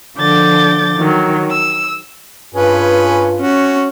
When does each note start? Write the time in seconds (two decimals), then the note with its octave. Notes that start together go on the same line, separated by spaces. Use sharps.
0.17 D3 F3 D6 G6 A6
0.98 D#3 F#3
1.50 E6
2.55 G2 C#4 F4 G#4 B4
3.40 C#4 F#4